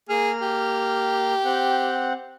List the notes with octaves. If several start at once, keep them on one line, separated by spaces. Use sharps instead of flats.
A#3 G#4 F6
G4
C4 F#5